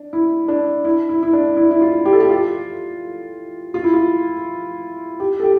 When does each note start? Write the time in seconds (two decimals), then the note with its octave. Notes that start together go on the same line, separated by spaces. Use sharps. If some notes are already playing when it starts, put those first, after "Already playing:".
Already playing: D4
0.13 E4
0.48 D4
0.84 E4
1.09 E4
1.23 E4
1.33 D4
1.57 E4
1.71 E4
1.81 F4
2.05 G4
2.13 A4
2.20 G4
2.29 F4
3.74 F4
3.84 E4
3.93 F4
5.20 G4
5.40 A4
5.43 G4